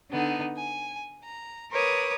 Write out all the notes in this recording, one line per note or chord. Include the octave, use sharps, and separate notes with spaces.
D3 B3 D#4
G#5
A#5
A#4 B4 C#5 D6 D#6